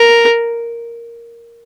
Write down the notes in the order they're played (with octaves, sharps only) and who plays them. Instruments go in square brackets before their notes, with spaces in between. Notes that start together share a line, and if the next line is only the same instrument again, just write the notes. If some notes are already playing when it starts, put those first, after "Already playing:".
Already playing: [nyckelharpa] A#4